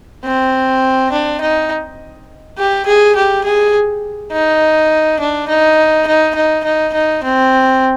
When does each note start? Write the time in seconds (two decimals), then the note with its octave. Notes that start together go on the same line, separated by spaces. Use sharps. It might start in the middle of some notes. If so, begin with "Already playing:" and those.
0.24 C4
1.12 D4
1.41 D#4
2.58 G4
2.86 G#4
3.16 G4
3.44 G#4
4.32 D#4
5.20 D4
5.48 D#4
6.07 D#4
6.35 D#4
6.64 D#4
6.94 D#4
7.24 C4